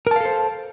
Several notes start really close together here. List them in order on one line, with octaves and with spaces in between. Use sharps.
A#4 A5 F5 A4 C5